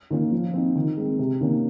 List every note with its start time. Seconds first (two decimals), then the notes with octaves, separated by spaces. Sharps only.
0.10 D#3 A#3 C#4 F4
0.32 F3
0.54 C4 D#4
0.75 D#3
0.97 G#3 C4
1.19 C3
1.41 D#3 A#3 C#4